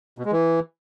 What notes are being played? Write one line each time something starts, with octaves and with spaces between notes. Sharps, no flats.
B2
G#3
E3